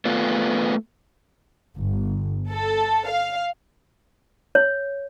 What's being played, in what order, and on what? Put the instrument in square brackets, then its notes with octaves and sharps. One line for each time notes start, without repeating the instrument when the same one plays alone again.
[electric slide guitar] A3 B3 F4
[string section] G1
A4
F5
[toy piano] C#5